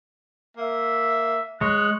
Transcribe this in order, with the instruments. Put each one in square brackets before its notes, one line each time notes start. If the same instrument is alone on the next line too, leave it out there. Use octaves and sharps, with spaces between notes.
[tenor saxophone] A#3 [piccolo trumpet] E5
[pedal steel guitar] G#3 [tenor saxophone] C#5 [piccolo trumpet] F#6